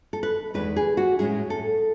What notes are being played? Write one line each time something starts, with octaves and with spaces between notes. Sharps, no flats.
A4
B4
E2 D#3 G#3 B4
G#4
F#4
A2 G#3 C#4 E4 G#4
A4